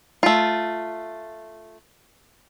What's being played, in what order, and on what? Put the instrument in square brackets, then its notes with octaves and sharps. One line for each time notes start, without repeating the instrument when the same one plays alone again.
[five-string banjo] A3 F4